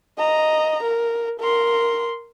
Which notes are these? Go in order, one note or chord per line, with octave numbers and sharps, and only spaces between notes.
D#5 A#5
A#4
A#4 C6